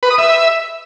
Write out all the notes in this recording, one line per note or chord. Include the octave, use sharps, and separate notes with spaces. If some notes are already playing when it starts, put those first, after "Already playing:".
B4
D#6
E5